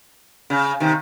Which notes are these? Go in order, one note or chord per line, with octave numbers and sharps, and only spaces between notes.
C#3
C3 D#3